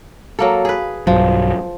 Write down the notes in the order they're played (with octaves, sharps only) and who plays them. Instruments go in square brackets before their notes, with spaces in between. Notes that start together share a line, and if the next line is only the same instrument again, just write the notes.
[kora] F#3 A#3 A4
G#4 B4
[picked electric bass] B1 G2 F#3 [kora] F3